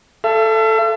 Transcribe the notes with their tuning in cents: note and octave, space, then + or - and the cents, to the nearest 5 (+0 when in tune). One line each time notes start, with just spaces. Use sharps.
A4 +0 E5 +45